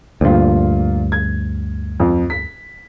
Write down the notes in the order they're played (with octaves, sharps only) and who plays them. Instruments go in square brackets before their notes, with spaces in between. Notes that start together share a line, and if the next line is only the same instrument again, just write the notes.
[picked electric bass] D2 G2 [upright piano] A#2 F4
[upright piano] G#6
F2
B6